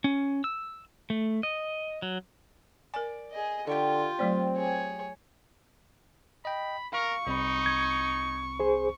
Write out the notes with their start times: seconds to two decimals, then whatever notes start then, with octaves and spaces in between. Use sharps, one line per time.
0.04 C#4
0.44 E6
1.10 A3
1.43 D#5
2.02 F#3
2.94 A#4 D5 G#5
3.31 G#4 D#5
3.67 D3 F4 G4 G5 C#6
4.19 F#3 A3 C4 D5
4.57 G#4 C#5
6.45 D#5 G5 B5
6.93 A#4 F5 C#6
7.27 C2 C4 D#4 B5
7.66 G#6
8.60 G#4 C5